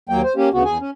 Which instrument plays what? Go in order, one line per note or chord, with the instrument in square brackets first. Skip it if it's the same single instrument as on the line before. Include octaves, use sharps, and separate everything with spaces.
[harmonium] D#2 F#3 A#3 G5
C5
A#3 C#4 G4
D2 C#3 B3 F#4
E2 G#4 G#5
C#4